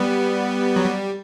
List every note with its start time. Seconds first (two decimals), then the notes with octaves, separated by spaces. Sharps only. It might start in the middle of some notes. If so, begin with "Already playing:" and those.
Already playing: G3 B3
0.76 F#3
0.86 G3